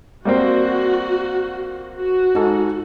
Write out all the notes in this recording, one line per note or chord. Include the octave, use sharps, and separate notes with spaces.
G3 A#3 C4 F#4
F#4
G#2 A4